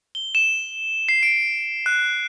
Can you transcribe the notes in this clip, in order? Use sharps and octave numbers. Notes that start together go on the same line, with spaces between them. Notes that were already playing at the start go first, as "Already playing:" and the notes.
G7
E7
C7
D7
F#6